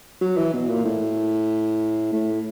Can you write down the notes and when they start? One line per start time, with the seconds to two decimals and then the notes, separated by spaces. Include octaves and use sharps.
0.21 F#3
0.37 E3
0.53 B2
0.69 A#2
0.85 A2
2.12 A2